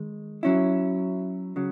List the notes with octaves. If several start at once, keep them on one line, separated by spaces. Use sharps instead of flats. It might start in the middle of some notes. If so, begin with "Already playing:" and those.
Already playing: D#3 G#3
F#3 C#4 E4
C#3 F#3